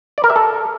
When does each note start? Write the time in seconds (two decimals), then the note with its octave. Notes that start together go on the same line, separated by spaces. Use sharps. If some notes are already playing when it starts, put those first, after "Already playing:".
0.18 D5
0.24 A#4
0.30 E5
0.36 A4